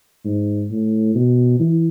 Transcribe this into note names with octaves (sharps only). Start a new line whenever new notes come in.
G#2
A2
B2
E3